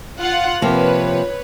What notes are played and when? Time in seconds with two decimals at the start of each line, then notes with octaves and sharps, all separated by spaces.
0.19 F4 F#5
0.62 C3 F3 A#3 B4 C#5